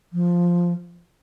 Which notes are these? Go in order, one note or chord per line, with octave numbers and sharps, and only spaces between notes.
F3